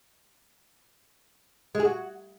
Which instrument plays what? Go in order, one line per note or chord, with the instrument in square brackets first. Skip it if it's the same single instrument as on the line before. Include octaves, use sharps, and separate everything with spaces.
[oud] G#3
G#4
F#4